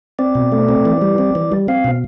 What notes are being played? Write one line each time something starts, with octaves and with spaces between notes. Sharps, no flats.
C4 D5
B2
A3
C4
E3
G3
C4
E3
G3
C4 F5
B2